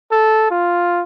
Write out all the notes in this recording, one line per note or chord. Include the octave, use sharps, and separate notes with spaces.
A4
F4